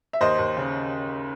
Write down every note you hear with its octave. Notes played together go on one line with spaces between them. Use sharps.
E5
D#2 C5 D#5
D#2
C#3